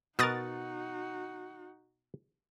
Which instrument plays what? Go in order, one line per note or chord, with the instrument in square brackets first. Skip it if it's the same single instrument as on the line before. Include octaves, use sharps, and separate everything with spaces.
[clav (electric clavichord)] B2 A#4 [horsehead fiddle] D#4 F#4 [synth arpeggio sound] D#6 F#6 A6